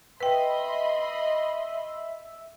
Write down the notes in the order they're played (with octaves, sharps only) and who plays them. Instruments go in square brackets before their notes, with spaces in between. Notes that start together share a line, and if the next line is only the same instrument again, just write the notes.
[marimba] B4 G5 [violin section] D#5 B5 C6 [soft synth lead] E5